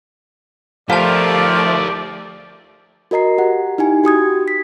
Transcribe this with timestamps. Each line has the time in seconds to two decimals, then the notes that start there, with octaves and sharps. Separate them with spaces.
0.90 F3 A3 G4 A#4 D5 F5 A5
3.11 F#4 A#4 D#5 A#5 C7
3.38 G4 F#5
3.78 D#4 E4 G4 G#5
4.04 F#4 G4 D#6 G#6
4.48 B6